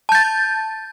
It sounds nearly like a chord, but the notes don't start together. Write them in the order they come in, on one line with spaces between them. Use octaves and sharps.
A5 G6 A6